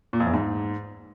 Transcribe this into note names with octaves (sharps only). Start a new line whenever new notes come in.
A#2
F2
E2
G#2